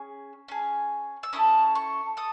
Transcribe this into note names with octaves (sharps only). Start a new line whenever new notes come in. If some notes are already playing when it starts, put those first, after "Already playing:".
Already playing: C#4 G#4
C#4 G#4
E6
C#4 E4 A4 D#6
C#6
A4 D#6